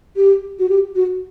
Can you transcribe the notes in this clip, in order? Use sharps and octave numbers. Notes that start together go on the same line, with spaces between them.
G4
F#4
G4
F#4